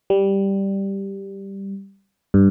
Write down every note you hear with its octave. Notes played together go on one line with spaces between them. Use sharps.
G3
G2